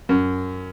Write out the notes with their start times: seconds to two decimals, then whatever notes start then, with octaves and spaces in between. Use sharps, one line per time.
0.09 F#2